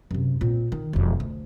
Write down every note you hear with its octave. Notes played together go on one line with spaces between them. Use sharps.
F#2 C3
A#2 C4
D#3
E1 F2
D2